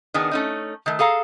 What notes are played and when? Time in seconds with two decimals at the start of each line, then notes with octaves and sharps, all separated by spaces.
0.14 D#3 B3 D4 G#4
0.31 A3 C#4 D#4
0.86 D#3 A3
0.99 G#4 A4 F5 A#5